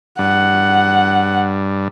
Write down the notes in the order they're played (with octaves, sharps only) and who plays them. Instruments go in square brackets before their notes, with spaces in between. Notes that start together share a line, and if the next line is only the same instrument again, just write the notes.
[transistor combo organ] G2 [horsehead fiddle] F#5